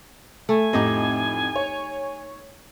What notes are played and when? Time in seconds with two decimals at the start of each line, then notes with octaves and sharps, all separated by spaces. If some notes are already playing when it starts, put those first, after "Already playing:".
0.49 A3 G#5
0.73 F2 A2 D#4 G4 D#5
1.56 C#5